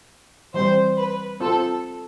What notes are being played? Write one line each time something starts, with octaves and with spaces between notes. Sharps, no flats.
E3 G3 C4 C5
B4
C4 F4 A4 C5